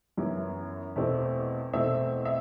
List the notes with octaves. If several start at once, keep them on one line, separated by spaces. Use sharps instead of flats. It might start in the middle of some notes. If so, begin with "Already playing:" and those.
F#2 E3 B3
E2 B2 A3 C4
E2 B2 A3 C4 E5
E5